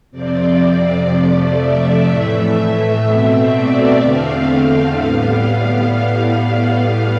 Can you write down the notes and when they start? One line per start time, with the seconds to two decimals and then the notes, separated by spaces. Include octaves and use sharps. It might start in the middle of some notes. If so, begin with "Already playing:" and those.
0.11 F2 C3 F3 C4 D5
1.08 F2 C3 F3 A3
1.57 E5
2.05 A2 E3 A3
3.02 B2 A3 C4
3.50 D5
3.98 E2 D3 A3 C4 F5
4.95 A2 G3 B3